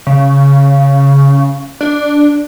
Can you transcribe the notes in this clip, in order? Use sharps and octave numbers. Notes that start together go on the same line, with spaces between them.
C#3
D4